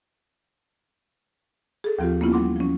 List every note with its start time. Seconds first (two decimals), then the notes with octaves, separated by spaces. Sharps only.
1.84 G#4 A4
1.99 D#2 F3 C4 F4 G4
2.21 A#3 B3 C#4 E4 F4
2.33 F#3 G3 F#5 C6 D6
2.56 F3 C#4